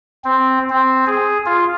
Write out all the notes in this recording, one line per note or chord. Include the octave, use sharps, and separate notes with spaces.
C4
C4
G#4
F4